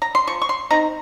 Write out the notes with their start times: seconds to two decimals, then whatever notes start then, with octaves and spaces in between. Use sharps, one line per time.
0.02 A#5
0.15 C6
0.27 F3 C#6
0.42 C#6
0.49 C6
0.71 C4 D#4 A#5